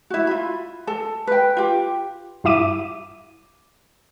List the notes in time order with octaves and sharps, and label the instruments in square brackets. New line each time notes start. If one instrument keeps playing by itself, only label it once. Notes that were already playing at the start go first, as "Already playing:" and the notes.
[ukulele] E4 F#4
F4 B5
A4 A5
B4 G5
F4 G4
[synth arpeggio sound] G2 E4 E5 D6 D#7